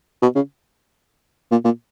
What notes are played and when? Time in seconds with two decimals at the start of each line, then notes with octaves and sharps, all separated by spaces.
0.22 B2
0.35 C#3
1.51 A#2
1.65 A#2